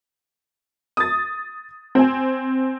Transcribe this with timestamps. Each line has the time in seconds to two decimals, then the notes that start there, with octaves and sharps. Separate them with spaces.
0.97 D#6 A6
1.95 C4 G#5